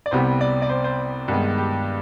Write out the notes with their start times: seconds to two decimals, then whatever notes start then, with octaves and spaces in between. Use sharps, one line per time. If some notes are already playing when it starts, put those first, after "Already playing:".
0.06 D5
0.11 C2 C3 G3 B3 C5
0.41 D5
0.62 D5
0.69 C5
0.84 C5
1.28 G2 D#3 G#3 B3
1.58 G4